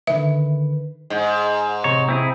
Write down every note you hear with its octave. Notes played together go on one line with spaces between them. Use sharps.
D3 D#3 B4 E5
G#2 D#5
A1 C3 C#5 A#5
C4 E4 G#4